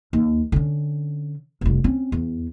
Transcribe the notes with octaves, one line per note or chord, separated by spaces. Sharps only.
D#2
D3 C#4
F1 C2
C4 C#4
E2